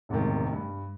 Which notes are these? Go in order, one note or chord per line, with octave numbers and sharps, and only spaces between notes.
E1 A1 G#2 C3 D#3
G2